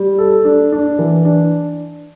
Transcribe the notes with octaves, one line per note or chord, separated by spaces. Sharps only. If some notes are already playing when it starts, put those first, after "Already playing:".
Already playing: G3
A4
D4
D4
E3
D4